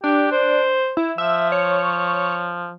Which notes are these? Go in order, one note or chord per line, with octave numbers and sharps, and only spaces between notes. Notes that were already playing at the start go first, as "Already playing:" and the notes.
D4 G4
C5
E4
F3 E5
C#5